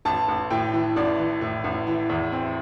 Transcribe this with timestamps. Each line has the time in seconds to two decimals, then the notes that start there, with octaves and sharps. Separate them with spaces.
0.05 A1 A5
0.28 A1
0.50 A2 G5
0.73 E3
0.96 A1 D5
1.19 E3
1.41 A2
1.64 A1
1.87 E3
2.09 E2
2.32 C4